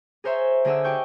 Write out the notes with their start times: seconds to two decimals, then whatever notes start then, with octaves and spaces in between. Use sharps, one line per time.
0.24 G#4 A#4 C5 C#5 E5
0.65 D3 D4 G#4 D#5 F#5 E6
0.84 G4 G5 C#6 G6